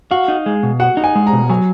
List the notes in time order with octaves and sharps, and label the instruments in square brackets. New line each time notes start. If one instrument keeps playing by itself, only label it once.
[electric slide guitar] F#4 [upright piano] F5
[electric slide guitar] D#4
G#3
B2
[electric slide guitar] F#4 [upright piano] F#5
[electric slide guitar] D#4
[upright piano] G#5
[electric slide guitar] G#3
[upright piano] A#5
[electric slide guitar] B2
[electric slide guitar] F#3 [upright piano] G#5